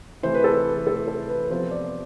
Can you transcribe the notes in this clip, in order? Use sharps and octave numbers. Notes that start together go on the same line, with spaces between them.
C3 E3 A3 C5
B4
A4
B4
C3 E3 A3 A4
A4
B4
C3 F3 B3 C5
D5